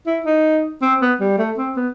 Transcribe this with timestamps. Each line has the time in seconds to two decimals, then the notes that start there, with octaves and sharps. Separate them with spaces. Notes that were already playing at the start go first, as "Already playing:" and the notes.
0.07 E4
0.26 D#4
0.81 C4
1.01 B3
1.20 G3
1.38 A3
1.57 C4
1.76 B3